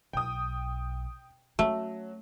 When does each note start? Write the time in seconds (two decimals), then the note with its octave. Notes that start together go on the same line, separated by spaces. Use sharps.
0.13 B1 G5 D#6
1.59 F#3 A3 C#4